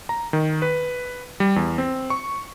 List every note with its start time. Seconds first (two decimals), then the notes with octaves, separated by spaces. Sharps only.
0.09 A#5
0.33 D#3
0.62 B4
1.40 G3
1.56 E2
1.78 C4
2.10 C#6